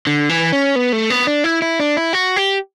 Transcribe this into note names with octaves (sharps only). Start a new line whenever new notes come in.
D3
E3
C#4
B3
A3
B3
D4
E4
E4
D4
E4
F#4
G4